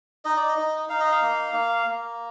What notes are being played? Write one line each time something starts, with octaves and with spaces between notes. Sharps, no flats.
D#4 D#5
D5
D#5
D#4
D#4 F5
D#5
F5
A#3
A#3
A#3